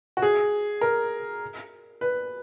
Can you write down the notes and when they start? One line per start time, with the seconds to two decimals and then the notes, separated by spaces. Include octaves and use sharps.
0.17 F#4
0.22 G#4
0.81 A#4
2.01 B4